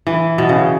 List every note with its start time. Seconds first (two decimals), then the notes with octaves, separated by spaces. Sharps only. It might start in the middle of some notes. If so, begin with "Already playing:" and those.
0.07 E3
0.38 B2
0.49 C#3